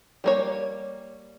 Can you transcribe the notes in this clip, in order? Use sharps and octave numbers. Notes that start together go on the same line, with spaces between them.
G3 A#3 C#5